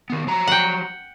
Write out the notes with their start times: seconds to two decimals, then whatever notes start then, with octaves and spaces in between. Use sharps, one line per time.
0.10 D#3 B3
0.27 F3 F#3 A#5
0.47 F#5 G5